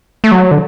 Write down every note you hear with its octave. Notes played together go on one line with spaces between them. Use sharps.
A3
F#3
D3